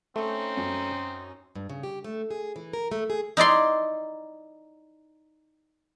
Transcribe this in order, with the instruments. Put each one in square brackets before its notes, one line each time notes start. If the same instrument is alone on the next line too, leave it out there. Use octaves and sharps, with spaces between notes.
[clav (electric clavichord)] A3 [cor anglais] C4 [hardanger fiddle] C#4 D#4
[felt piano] F#2
[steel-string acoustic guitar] G2
C#3
G4
A3
G#4
E3
A#4
A3
G#4
[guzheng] D#4 E4 D5 C6